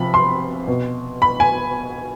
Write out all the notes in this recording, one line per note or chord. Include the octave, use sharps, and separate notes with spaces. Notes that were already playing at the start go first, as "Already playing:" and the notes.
Already playing: C3 F3 B5
C6
B2
B5
G#5